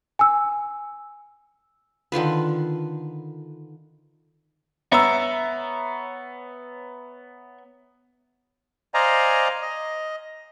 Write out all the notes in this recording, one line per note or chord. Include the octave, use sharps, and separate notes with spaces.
G#5 E6
D3 D#3 F4 B4
B3 C#5 E5 A#5 E6
C5 D5 D#5 F5 G#5 A#5
D#5